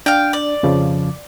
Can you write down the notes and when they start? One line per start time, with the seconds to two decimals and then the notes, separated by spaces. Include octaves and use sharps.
0.06 D4 F5 G5
0.33 D5
0.63 F2 C#3 F3